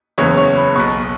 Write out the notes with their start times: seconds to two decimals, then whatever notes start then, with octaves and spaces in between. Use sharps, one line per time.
0.18 F#1 E2 C#3 E3 C#5
0.38 C#5
0.57 B5
0.76 B1 B2 C#6